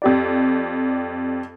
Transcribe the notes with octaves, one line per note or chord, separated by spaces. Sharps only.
F2 G4 D5